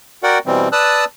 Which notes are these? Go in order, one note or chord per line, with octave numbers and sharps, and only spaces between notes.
F#4 A#4 D5 F#5 G5
B2 E3 G3 C4
B4 D5 A5 D#6 E6 F#6